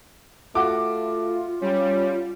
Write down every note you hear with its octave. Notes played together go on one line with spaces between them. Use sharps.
A3 F4 F#4 D6
G3 C#4